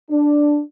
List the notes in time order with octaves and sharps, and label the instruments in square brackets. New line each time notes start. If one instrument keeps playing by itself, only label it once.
[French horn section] D4